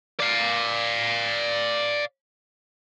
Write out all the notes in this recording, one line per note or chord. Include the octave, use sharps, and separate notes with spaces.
D5 F5